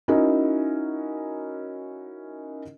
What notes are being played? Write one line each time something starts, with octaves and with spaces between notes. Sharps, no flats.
C#4 D#4 E4 F#4 A#4 D#5